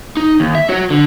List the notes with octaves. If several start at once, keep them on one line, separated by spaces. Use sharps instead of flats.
D#4
D#2
E5
F#4 C#5
D3